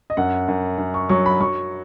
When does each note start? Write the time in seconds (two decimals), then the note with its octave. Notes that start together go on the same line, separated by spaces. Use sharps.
0.10 D#5
0.17 F#2 F#5
0.48 F#2
0.78 F#2
0.94 C#6
1.09 F#3 C#6
1.26 B5
1.40 F#3 C#6